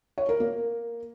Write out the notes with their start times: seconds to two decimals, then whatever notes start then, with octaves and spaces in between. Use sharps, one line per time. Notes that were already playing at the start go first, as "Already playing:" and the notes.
0.18 C#5
0.29 A#4
0.40 A#3